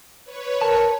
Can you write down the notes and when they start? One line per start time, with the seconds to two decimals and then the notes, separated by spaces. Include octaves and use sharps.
0.24 B4 C#5
0.61 A#4 A5